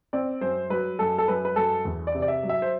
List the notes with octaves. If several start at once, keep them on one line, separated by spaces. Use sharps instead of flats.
C4 D5
F#2 C5
F#3 B4
F#2 A4
A4
F#2 B4
B4
F#2 A4
E2
D5
C3
D5
E5
F#3
E5
C5